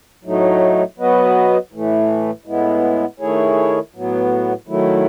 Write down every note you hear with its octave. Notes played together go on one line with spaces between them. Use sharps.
A2 F#3 A3 D#4
F#3 B3 F#4 B4 D#5
A2 E3 A3
A2 G#3 B3 E4
D#3 A3 E4 G#4 C#5
A2 F#3 B3
D#3 F#3 A3 E4